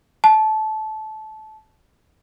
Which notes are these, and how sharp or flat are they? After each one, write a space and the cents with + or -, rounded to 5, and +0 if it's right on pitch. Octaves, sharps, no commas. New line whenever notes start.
A5 -20